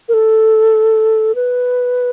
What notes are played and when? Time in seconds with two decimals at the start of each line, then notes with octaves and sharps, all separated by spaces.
0.09 A#4
0.14 A4
1.35 B4